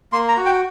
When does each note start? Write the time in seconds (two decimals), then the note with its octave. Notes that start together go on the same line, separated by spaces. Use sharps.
0.12 A#3 C6
0.28 A#5
0.37 F#4
0.46 G5